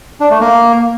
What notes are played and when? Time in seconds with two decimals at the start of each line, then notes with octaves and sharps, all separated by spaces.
0.20 D4
0.30 A3
0.41 A#3